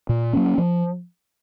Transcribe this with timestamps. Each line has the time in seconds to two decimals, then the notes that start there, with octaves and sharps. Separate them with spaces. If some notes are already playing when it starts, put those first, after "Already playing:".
0.09 A#2
0.33 F#3 A#3 C#4
0.58 F3